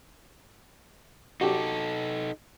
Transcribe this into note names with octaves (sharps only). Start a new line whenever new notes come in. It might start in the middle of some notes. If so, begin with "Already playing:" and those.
D#4 F#4 G4 A4